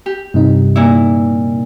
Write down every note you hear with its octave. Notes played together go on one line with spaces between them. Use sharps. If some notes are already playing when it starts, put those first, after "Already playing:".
G4
G2 C3 D#4
A#2 E4